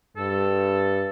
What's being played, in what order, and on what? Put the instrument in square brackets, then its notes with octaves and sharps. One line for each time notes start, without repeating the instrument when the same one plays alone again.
[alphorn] G2 [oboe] A4